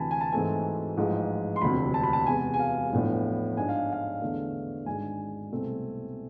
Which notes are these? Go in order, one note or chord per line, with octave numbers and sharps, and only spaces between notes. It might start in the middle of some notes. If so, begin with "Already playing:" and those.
Already playing: D2 C3 E3 G#5 A5 B5
G#5
A5
G#2 E3 A3 C4 G#5
A1 G#2 F3 G#3
C6
E1 D2 C3 B5
A5
B5
A5
E2 C3 G#3 G#5
G#5
F5
A1 A2 F3 B3 D4
G#2 G#3 D4 G#5
F5
F5
E2 D3 A3 D4
G#1 G#2 G#3 D4 G#5
C2 B2 A3 C4